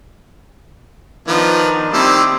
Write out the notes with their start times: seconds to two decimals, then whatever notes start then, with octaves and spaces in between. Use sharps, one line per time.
1.28 D#3 F3 B3 D4
1.93 D#3 G3 C4 E4 D6